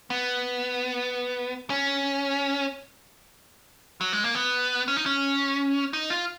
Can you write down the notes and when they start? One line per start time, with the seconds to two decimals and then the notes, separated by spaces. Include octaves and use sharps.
0.10 B3
1.70 C#4
4.01 F#3
4.13 G#3
4.24 A#3
4.35 B3
4.88 C#4
4.97 D#4
5.06 C#4
5.93 D#4
6.10 F4